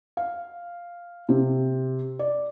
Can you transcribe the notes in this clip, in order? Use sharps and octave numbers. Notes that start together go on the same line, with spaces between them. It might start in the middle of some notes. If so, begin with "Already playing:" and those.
F5
C3
D5